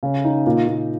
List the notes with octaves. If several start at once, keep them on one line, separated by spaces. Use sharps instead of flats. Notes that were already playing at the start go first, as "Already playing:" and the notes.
C#3
D#4
A#2
A#2